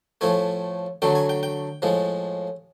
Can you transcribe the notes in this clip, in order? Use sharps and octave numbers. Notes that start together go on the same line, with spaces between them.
A2 F3 A3 G#5
D3 F#3 A3 G5
G#5
G5
G5
A2 F3 G#3